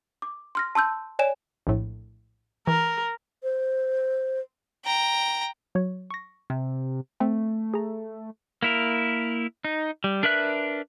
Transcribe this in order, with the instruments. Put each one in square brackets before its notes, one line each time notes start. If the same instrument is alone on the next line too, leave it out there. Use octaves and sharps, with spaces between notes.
[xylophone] D6
C6 F6 A#6
A5 C6 E6 G6
C#5 D5 G#5 E7
[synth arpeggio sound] A#1 A2
[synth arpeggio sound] E3 [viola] A#4
[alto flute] C5
[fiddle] G5 A#5
[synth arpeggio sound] F#3 C#5
C#6 A#6
[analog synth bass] C3
[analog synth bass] A3 [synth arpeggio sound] C4
[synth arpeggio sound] G#4 A#5
[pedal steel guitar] A#3 E4 A#4
D#4
G3
D4 A#4 B4 E5 F#6